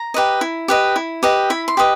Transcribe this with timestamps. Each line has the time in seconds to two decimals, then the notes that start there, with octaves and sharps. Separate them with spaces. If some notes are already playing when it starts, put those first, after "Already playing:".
Already playing: A#5
0.14 G4 B4 D#5
0.41 E4
0.68 G4 B4 D#5
0.96 E4
1.23 G4 B4 D#5
1.50 E4 B5
1.68 C6
1.77 G4 B4 D#5